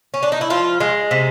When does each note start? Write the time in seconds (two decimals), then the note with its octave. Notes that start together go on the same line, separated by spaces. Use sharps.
0.14 C#4
0.23 D4
0.32 D#4
0.41 E4
0.50 F3 F4
0.80 G#3
1.11 C3